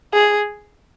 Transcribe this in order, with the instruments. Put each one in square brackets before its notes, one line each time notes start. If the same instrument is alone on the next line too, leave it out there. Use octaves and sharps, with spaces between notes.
[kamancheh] G#4